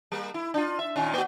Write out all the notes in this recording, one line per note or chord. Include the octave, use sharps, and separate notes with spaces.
G3 A#3
E4
D4 F4
E5
A#2 D#3 C#4
A#3 F#4